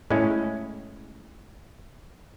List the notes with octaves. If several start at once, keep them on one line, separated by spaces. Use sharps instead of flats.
A2 G#3 C#4 E4